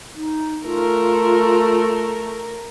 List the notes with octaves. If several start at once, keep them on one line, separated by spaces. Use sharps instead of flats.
D#4
A3 F4 A#4